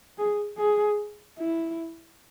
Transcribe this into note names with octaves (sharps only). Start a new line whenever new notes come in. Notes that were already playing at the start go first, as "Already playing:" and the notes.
G#4
G#4
E4